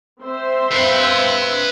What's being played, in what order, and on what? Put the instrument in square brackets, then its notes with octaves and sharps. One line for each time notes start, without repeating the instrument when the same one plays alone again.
[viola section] C4 C5 E5
[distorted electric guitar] B4 F5